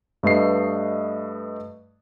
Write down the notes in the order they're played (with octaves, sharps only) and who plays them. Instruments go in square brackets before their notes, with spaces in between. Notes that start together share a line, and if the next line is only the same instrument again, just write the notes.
[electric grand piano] G2 A3 B4 D#5 C7